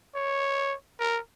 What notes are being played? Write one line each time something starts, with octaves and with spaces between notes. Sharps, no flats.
C#5
A#4